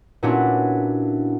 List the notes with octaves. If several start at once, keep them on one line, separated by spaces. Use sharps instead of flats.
A#2 B3 C#4 D4 E4 F#4